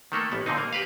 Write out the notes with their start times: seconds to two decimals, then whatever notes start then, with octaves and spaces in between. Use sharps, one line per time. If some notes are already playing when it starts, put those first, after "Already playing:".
0.12 D#3 A3 A#3 A4
0.32 A1 B3
0.46 A#2 D3 C4 D#4
0.58 A#3
0.73 G4 B4 F5